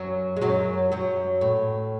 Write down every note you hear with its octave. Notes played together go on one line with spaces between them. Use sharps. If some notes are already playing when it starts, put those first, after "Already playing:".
Already playing: F#2 F#3
G#3
F#2 F#3
F#2 F#3
A2